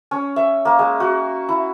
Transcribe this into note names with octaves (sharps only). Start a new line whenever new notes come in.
C#4
E5
A#3
G#3
F#4
E4